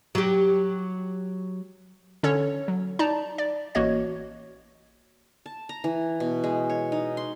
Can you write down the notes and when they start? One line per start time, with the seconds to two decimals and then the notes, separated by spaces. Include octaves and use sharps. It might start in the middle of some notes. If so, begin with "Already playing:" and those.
0.15 F#3 G4
2.23 D3 C#4 A4 C#5
2.68 F#3
2.99 D#4 D5 A5 A#5
3.38 D5
3.75 A1 A#3 F#4 C#5 D#5 G#6
5.46 A5
5.69 A#5
5.84 E3
6.20 B2
6.44 G#3
6.70 C#5
6.92 D#4
7.17 C6